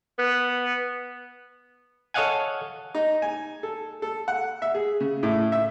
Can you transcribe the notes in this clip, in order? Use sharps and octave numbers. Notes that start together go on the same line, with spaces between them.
B3
A4 C#5 D#5 F5 F#5 G#5
D#4
G#5
A4
A4
F#5
E5
G#4
C#3
A2
E5